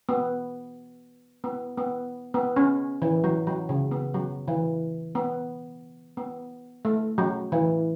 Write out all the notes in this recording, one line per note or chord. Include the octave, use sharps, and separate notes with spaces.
B3
B3
B3
B3
C#4
E3
F#3
F#3
C#3
B3
F#3
E3
B3
B3
A3
F#3
E3